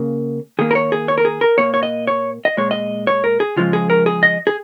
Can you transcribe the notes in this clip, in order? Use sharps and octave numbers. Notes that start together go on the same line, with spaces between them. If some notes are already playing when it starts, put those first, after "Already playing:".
Already playing: C#3 A#3
D#3 A#3 G#4
A#4
C#5
G#4
C#5
A#4
G#4
A#4
A#2 A#3 C#5
C#5
D#5
C#5
D#5
A#2 G#3 C#5
D#5
C#5
A#4
G#4
C#3 F3 G#3 F4
G#4
A#4
G#4
D#5
G#4